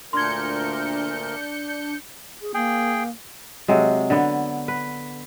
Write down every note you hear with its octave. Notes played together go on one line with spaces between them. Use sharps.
D2 A#2 D4 A#4 C6 G6 G#6 C#7
G#4
A#3 G#4 G5
C3 F#3 G#3
D3 B3
B4